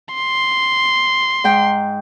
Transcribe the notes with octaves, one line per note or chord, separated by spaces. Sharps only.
C6
G#2 G5